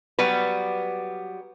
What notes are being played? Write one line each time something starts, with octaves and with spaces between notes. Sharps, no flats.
F#3 G3 B3 B4